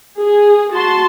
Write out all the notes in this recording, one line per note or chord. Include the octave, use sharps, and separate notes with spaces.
G#4
F#4 A5 C6